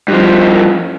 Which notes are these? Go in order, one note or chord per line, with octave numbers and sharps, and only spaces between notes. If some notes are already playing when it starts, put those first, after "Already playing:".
G2 F3